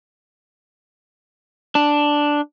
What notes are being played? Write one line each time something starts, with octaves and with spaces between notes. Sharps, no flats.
D4